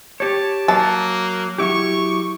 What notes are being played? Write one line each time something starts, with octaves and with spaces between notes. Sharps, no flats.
G4 C#5 A5
F#3 A#3 A5
F#3 E4 G4 C#6